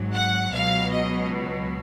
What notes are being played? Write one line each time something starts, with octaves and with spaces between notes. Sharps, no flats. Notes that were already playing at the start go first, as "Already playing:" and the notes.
Already playing: G#1 G#2 F#3
F#5
C#2 B2 F#3 F5
D#5